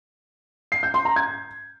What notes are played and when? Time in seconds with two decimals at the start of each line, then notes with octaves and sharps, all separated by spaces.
0.72 C7
0.83 G6
0.94 C6
1.05 A#5
1.16 G#6